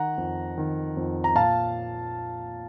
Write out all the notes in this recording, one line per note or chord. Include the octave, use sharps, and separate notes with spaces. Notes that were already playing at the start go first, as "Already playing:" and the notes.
Already playing: D#3 F#5 A#5
F2
D#3
F2
A#5
A#2 F5 A5